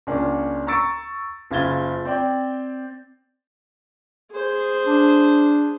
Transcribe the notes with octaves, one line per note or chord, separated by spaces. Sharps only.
C#2 A#3 C#4 D4
A#5 C#6 E6 A6 C#7 D7
F#1 C#3 F4 G#6 A6 G7
C4 D5 G5
G#4 C5
D4